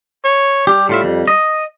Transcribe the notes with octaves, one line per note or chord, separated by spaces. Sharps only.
C#5
G3 G4
A2 F4 E5
F2
D#5